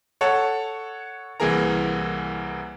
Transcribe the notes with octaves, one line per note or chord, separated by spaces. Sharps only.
A4 C#5 F#5 A5
C2 E3 A#3 G#4 A#4 A#5